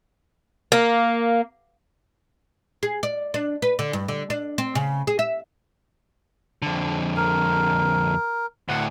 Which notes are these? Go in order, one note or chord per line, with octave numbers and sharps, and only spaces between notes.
A#3
G#4
D5
D4
B4
D3
G2
D3
D4
C4
C#3
G#4
E5
F2 D3
A#4
D2 A2 F#5